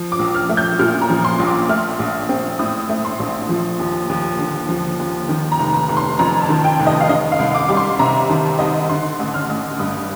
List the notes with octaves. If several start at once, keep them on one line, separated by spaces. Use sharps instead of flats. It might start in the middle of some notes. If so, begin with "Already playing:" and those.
Already playing: F3
D6
A#1
F6
A3
G6
A#2 F6
A#5
F3
C6
A#1
D6
A3 F6
A#1
C4
A2 D#6
A3
C6
A#1
F3
D#2
D#2
D3
F3
D#2
D#3
A#5
F1
A#5
F1
C6
F2 A#5
A5
D#3
G5
F1
D#5
F5
D#3 D#5
F5
C2
D6
G3 D6
C6
C3 A#5
D#3 A5
C2 D#5
D3 C6
A1
F6
A1
G2 D#6